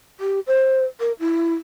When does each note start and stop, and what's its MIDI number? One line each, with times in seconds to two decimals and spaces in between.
0.20 0.40 67
0.47 0.84 72
1.00 1.12 70
1.20 1.54 64